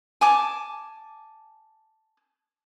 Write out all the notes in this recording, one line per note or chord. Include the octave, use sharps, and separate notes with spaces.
G#5 A5 D6